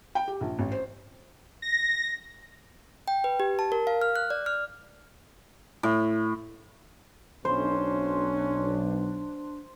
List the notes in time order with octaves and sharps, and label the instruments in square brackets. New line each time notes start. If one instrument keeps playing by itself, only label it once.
[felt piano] G5
G4
A#1
A1
C5
[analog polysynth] A#6
[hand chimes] G5
B4
G4
A5
A#4
F5
F6
F#6
D5
F6
[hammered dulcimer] A2
[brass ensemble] B1 [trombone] C#4 [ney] D4 [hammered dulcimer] C5